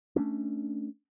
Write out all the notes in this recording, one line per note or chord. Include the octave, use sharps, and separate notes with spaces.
A3 B3 C#4 D4